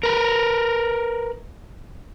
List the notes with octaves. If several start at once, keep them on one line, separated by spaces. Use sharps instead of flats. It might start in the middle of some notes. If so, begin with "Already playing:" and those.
A#4 B4